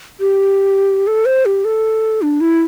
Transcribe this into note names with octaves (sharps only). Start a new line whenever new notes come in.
G4
A4
C5
G4
A4
D4
E4